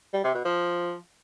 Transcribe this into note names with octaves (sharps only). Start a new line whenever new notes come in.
G3
C3
B2
F3